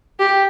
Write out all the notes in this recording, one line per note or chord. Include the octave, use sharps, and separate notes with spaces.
G4